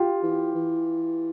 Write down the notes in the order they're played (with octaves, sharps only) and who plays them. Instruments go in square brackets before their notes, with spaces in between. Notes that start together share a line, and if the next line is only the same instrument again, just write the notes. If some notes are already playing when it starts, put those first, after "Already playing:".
Already playing: [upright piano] F4 G4
[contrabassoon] E3
E3